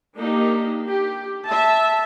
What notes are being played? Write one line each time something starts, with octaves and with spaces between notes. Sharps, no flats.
A#3 D4 D#4 G4
G4
E5 A5